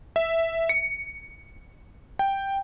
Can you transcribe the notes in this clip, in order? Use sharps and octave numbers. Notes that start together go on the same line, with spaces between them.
E5
C#7
G5